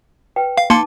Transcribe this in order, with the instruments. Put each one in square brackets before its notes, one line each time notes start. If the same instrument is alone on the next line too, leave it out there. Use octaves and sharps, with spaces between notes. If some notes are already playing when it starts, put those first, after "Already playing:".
[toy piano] B4 G5
[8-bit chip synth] F5
[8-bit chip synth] A#3 C6 C#7 [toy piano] D#4 A5 D6